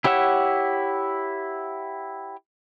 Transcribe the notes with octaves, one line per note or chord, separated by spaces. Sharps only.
E4 G4 C#5 F#5 E6